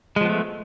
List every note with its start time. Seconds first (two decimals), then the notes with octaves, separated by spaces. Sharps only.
0.16 G#3
0.21 F3
0.25 B3
0.29 A3